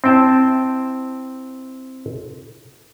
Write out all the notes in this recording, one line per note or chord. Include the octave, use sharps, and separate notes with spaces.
C4 E4 G5 A5